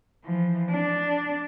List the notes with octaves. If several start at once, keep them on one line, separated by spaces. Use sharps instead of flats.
E3 F3
D4